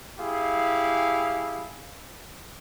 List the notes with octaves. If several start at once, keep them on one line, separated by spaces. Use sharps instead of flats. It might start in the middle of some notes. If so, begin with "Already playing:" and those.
E4 G4 G#4 F5